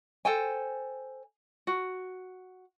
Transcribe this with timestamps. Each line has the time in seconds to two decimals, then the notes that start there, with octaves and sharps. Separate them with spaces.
0.25 A4 C5 G5 G#5
1.67 F#4